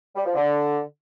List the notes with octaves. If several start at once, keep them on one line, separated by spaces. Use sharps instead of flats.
G3
F3
D3